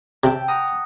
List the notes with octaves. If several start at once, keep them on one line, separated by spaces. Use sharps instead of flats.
C3 G5 A5 E6
F#5 A#5 D#6